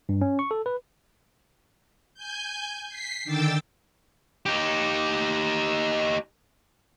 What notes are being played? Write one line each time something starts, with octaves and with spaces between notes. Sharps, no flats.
G2
C#4
C#6
A4
B4
G#5 G6
B6 C7
D3 D#3 G5 D6 E6 A6
D#4 G4